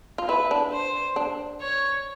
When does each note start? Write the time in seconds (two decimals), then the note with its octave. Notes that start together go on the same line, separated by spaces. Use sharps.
0.18 F4
0.28 E4 B4
0.51 D4
0.73 C5
1.16 D4
1.61 C#5